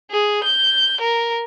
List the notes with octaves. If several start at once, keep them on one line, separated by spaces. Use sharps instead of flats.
G#4
G6
A#4